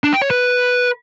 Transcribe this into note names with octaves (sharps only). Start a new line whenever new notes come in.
D4
G5
C#5
B4